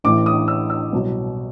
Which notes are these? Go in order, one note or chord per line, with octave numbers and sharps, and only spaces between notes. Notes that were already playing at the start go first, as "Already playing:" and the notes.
A1 A2 E3 D6
D#6
E6
E6
C2 B2 F#3